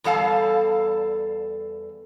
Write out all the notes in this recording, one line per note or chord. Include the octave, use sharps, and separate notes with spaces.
E2 G3 A4 F5 A5